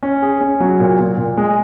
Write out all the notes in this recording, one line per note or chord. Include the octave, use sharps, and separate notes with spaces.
C#4
G#4
C#4
F#3
A#2
A#2
A#2
G#3